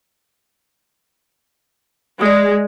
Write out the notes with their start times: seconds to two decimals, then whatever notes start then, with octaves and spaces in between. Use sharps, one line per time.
2.21 G#3 D5 D#6